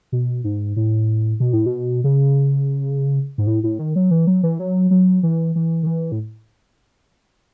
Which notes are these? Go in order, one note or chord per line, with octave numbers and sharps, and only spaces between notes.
B2
G#2
A2
B2
A2
B2
C#3
G#2
A2
A2
D#3
F#3
E3
F#3
E3
F#3
F#3
E3
E3
D#3
E3
A2